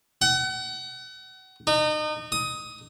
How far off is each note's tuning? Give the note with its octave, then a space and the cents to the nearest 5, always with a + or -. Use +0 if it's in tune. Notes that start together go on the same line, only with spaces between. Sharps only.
F#5 +35
D#4 -30
D#6 +15